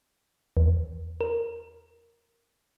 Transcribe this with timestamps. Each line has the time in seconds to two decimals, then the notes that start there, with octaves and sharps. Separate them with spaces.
0.57 E2
1.21 A#4